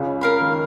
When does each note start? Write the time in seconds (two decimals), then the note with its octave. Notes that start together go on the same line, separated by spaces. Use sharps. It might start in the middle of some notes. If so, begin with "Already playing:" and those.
Already playing: C#2 C#3
0.21 A#4 F5 B5
0.41 D#3